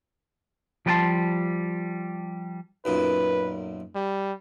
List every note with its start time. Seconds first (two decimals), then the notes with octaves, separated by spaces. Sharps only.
0.86 F3 G3 B4 G5 A5 C6
2.85 B1 F#2 A#2 B4
3.95 G3